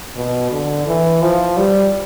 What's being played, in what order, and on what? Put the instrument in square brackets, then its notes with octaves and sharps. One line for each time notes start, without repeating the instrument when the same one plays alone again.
[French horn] B2
D3
E3
F3
G3